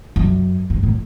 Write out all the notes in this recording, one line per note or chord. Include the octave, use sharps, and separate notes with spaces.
F#2
G2
A2